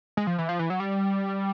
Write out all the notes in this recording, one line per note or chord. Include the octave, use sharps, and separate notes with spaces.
G#3
F3
E3
F3
E3
F#3
G3